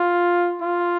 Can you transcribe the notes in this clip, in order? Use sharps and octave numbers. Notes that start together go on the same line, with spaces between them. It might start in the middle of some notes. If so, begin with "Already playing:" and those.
Already playing: F4
F4